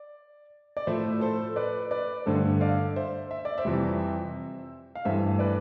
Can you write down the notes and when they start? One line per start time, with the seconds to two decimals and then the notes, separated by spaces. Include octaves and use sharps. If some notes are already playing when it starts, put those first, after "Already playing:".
Already playing: D5
0.77 D5
0.87 A2 F3 A3 C5 E5
1.21 A4 C5
1.56 B4 D5
1.91 B4 D5
2.26 G2 D3 A3 A4 C5
2.61 D5 F5
2.96 C5 E5
3.31 E5
3.45 D5
3.58 C5 E5
3.65 F2 C3 E3 G3
4.95 F5
5.05 G2 E3 A3 C5 E5
5.39 B4 D5